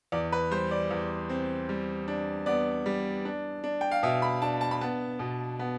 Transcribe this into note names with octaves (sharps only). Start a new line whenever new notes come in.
E2 D5
B4
G3 C5
D5
E2
C4
G3
D4
B3 D5
G3
D4
D4
G5
F5
B2 E5
B5
D4 A5
A5
B5
B3 A5
B2
B3